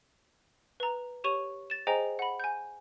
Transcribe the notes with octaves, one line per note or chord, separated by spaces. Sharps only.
B4 A#5
G4 C#5 C#6 D#7 F7
A6 E7
G#4 C5 D#5 G5 G#5 A#5
F#5 B5
G#5 G6